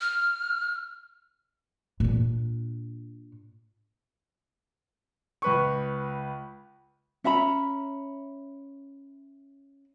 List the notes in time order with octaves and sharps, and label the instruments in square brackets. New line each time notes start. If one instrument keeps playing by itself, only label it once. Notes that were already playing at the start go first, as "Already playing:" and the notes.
[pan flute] F6
[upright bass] A#2 D4
[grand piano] C#2 B4 C#6
[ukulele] C#4 E5 A#5 B5